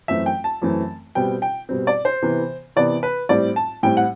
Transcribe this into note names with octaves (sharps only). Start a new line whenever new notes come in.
F#2 E3 A3 C4 E5
G5
A5
F#2 E3 A3 C4
B2 G3 C4 G5
G5
B2 G3 C4
D5
C5
C3 E3 B3
C3 E3 B3 D5
B4
A2 G3 C4 D5
A5
A2 G3 C4 G5
F#5